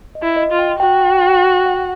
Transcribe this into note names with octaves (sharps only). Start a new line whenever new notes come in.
D#5
E4
D#5
F4
G5
F#4 G5
G5
G5
G5
F#5